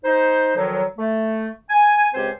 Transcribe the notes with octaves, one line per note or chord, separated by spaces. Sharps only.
D#4 C5
D2 D#3 F3 F#3
A3
G#5
C#2 G#3 C4 G4 C5 G#5